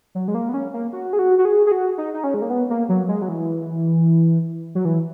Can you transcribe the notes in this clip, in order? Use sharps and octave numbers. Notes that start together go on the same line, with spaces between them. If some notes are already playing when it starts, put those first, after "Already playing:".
F#3
G#3
A#3
B3
C#4
A#3
F#4
G#4
F#4
F#4
G#4
G#4
F#4
D#4
D#4
C#4
G#3
A#3
B3
A#3
F#3
G#3
F#3
E3
F#3
E3